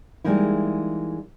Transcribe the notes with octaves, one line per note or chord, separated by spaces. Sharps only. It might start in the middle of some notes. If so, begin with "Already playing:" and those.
E3 G3 G#3 A#3 D#4 E4